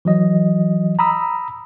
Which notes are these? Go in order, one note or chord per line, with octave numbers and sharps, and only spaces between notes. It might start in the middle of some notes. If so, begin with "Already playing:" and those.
E3 F#3 D#5
A#5 B5 D#6 E6